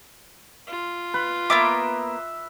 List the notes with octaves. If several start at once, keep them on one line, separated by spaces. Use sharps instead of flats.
F4
B4
A#3 B3 E5 D6